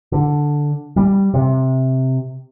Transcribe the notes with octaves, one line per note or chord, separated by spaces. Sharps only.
D3
G3
C3